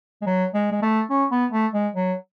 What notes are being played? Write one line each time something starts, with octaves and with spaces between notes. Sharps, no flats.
G#3
F#3
G#3
G#3
A3
C#4
B3
A3
G#3
F#3